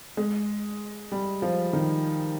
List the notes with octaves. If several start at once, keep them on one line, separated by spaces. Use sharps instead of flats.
G#3
G3
F3
D#3